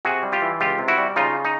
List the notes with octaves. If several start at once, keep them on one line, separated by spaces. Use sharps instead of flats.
C3 F#4 G#4
G3
F4 G4
E3
C#2 F4 G4
C3
E4 F#4
G3
C#3 D#4 F4
D#4